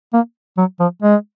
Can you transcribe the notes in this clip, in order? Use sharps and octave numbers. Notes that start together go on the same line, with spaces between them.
A#3
F#3
F3
G#3